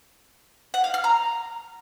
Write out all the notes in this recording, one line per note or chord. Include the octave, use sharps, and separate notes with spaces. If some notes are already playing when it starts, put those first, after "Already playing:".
F#5
F5
F6
A#5